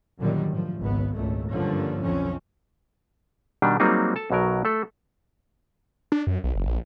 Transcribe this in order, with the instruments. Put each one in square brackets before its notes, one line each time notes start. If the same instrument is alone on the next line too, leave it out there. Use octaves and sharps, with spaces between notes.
[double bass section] F#2 A#2 D3 D#3 F#3 G3
A2 F3
G#1 C#2 B3
G#1 C#2 A#2 A3
G2 D3 F3 A#3 C#4
B1 F2 F3 C4 C#4
[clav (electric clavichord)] B2 D#3 G3 D4
F#3 G3 A#3 C4 D#4 G#4
A4 A5
B1 B2 F#3 A#4
A3 A4
[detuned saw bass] D4
F#2
B1
F#1
A#1